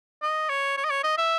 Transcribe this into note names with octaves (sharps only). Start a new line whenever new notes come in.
D#5
C#5
C#5
D#5
C#5
D#5
E5